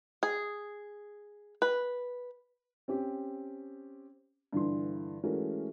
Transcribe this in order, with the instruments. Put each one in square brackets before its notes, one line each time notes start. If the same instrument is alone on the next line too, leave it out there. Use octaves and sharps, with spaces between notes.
[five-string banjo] G#4
B4
[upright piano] C4 C#4 G4
G2 D3 E3 C6
E3 G#3 A3 C#4 F#4 A#4